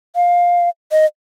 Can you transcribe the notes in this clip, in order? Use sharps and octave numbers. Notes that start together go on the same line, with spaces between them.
F5
D#5